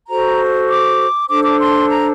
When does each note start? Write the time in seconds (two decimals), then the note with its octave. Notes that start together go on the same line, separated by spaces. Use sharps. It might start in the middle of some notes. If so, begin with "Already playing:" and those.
0.09 F#4 A4 C5 A#5
0.69 D6
1.29 D4 A4 C5 D6
1.44 D6
1.59 C6
1.89 A#5